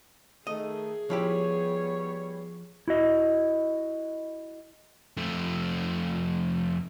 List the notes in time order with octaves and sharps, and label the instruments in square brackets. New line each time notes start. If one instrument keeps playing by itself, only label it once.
[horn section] D#3 A3 [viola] G#4 [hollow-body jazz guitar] D#5
[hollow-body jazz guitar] F3 E4 G4 [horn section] G3 B3 C#5
[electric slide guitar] E4 F#4 D#5
[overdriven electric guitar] F2 A3